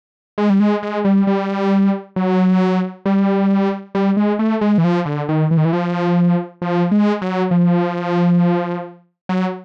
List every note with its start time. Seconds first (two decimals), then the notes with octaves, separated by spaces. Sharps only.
0.38 G#3
0.50 G3
0.60 G#3
0.83 G#3
1.05 G3
1.27 G3
2.16 F#3
3.06 G3
3.95 G3
4.17 G#3
4.39 A3
4.61 G#3
4.78 E3
4.84 F3
5.06 D3
5.29 D#3
5.51 E3
5.57 D#3
5.65 E3
5.73 F3
6.62 F3
6.91 G#3
7.22 F#3
7.51 F3
9.29 F#3